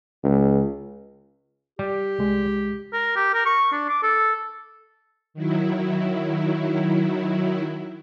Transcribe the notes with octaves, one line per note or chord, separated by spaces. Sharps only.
C#2
G3 G4
C2 G#3
A#4
G4
A#4
C#6
D4
D6
A4
D#3 F#3 E4